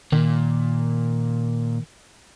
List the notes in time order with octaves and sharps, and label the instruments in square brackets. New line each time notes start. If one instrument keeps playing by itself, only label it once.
[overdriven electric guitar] A#2 [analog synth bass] D#3